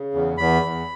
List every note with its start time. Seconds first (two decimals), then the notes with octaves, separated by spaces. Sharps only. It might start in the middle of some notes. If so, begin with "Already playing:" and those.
Already playing: C#3
0.14 E2
0.38 E2 B5
0.63 E2